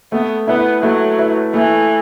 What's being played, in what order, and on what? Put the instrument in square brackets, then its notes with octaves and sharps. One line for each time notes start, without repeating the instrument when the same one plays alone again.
[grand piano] A3 [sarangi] B3
[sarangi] B3 [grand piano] E4 B4
[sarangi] F#3 [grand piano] A3
[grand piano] E4 B4
[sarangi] E3 [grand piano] A3